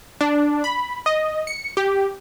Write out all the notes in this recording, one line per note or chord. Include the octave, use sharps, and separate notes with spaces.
D4
B5
D#5
C#7
G4